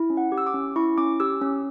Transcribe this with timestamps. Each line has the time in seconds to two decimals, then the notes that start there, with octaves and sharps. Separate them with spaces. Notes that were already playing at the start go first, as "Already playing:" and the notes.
Already playing: E4
0.10 C#4
0.17 F#5
0.32 G4
0.38 E6
0.47 D6
0.54 C#4
0.76 E4 C#6
0.97 C#4 D6
1.20 G4 E6
1.42 C#4